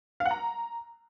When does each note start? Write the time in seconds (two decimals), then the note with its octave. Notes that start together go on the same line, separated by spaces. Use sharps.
0.20 F5
0.26 F#5
0.31 A#5